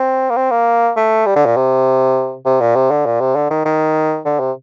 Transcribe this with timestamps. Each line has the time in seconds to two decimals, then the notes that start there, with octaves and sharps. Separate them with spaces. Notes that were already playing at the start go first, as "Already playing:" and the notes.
Already playing: C4
0.30 A#3
0.37 C4
0.51 A#3
0.96 A3
1.26 G3
1.36 D3
1.46 A#2
1.56 C3
2.45 C3
2.61 A#2
2.76 C3
2.91 D3
3.06 A#2
3.21 C3
3.36 D3
3.50 D#3
3.65 D#3
4.26 D3
4.40 C3